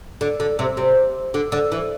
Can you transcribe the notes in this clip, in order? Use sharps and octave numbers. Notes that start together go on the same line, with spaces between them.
D3
D3
C3
C3
D3
D3
E3